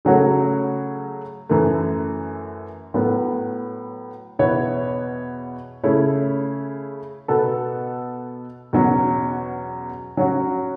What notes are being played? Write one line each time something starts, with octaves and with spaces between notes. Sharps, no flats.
C#3 F#3 A3 F#4 C#5
F#2 E3 A3
A2 F#3 B3
E2 B2 B3 E4 C#5
C#3 A3 E4 C#5
B2 B3 F#4 A4
E2 B2 F#3 C#4
F#3 C#4 F#4